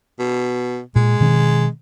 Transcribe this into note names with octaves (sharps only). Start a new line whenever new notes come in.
B2
A#2 G#3
B2 D#3 C4